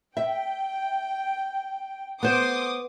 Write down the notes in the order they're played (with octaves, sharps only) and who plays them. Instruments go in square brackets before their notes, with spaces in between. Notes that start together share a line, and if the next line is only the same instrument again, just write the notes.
[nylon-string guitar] E5 [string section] G5
[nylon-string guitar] B3 C5 [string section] C6 D6 D#6